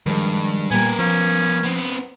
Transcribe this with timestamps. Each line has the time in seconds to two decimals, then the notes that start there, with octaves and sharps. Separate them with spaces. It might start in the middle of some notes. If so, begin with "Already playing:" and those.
0.06 G2 D#3 F3 G#3
0.71 A#2 G3 B3 A#4 G#5
0.99 F3 C#4
1.64 B3 C4